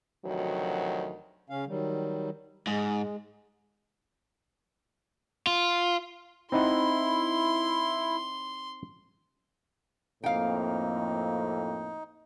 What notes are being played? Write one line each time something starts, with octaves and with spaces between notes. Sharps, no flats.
D2 C3 D#3 F3 F#3
C#3 C#4 F5
D#3 F#3 G3
G#2 G#3
F4
C4 D#4 E4 F#5 C6
F2 A2 A#3 C4 D#4 F5 G5